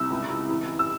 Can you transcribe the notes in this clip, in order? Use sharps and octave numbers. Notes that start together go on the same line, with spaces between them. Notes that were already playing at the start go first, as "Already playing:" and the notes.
Already playing: C2 E6
C#2
C#2
E3
E3
E6